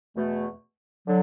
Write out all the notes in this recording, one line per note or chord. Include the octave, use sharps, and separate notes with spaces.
E2 B2 A3
D3 F#3